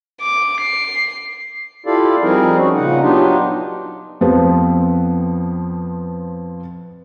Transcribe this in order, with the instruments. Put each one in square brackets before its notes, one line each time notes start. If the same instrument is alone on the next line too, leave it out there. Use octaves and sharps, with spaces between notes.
[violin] D6
C7
[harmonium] E4 F4 G4 A4 D5 F5
F3 G3 C4 D#4 G#4 A#4
C#4 F#4
A#2 C#3 D#4 F#5
F#3 B3 D4 D#4 F4 G4
[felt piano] F2 F3 B3 C4 B4